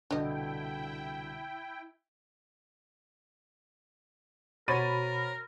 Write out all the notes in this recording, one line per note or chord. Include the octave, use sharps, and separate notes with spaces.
C2 B2 D3 D4 E4 D#5 G5
B2 F#4 A#4 C5 C#5 B5 A6 D#7